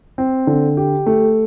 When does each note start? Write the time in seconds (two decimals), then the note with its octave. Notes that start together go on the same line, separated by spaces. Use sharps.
0.18 C4
0.47 D3
0.77 G4
1.06 A3